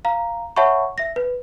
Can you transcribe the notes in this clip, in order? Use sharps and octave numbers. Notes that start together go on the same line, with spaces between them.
F5 A#5
C#5 E5 F#5 A5 B5 C#6
E5 A#6
B4